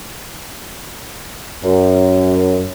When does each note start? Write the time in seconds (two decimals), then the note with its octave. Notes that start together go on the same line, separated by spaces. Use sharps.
1.64 F#2